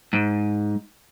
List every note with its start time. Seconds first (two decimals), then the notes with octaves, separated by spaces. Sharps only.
0.13 G#2